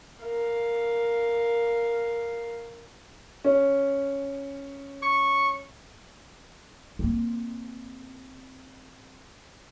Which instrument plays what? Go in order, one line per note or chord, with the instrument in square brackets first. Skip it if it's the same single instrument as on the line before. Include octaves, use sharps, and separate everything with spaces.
[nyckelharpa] A#4 F5
[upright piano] C#4
[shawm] C#6
[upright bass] A#3 C4